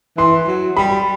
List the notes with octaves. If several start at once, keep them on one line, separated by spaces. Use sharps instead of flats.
E3 C6
F#3
G3 B5